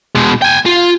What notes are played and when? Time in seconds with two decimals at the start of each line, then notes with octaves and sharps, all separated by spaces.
0.15 B2 G#3
0.42 G5 G#5
0.66 F4